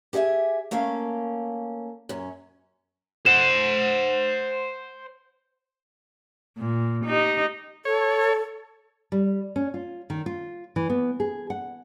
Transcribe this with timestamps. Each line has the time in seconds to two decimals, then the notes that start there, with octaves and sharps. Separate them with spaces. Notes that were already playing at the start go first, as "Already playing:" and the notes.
0.13 G4 G#4 D#5 E5 G#5
0.71 A3 A#3 C#4 F5
2.09 F#2 C#4
3.26 C5 F#5 E7
6.57 A#2
7.05 D#4 G4
7.85 A4 C#5
9.12 G3
9.56 C#4
9.74 F4
10.10 D#3
10.26 F4
10.76 E3
10.90 B3
11.20 G#4
11.50 F#5